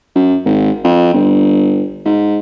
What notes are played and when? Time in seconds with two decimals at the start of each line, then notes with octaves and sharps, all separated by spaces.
0.15 F#2
0.45 G#1
0.84 F2
1.14 G1
2.05 G#2